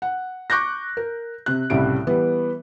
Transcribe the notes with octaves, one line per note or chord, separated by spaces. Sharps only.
F#5
C#6 D6 F#6 G6 A#6
A#4
C3 F#6
C2 A2 C#3 G3 E4 D7
E3 G3 B3